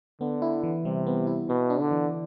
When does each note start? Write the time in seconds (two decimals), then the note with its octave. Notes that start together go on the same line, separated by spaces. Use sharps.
0.21 D3 B3
0.42 E4
0.63 E3
0.85 C3 G3
1.07 B3
1.27 E4
1.49 B2 B3
1.70 D4
1.80 D3
1.91 E3